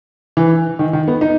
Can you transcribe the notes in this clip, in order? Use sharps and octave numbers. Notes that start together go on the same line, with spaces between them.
E3
D#3
D#3
B3
D#4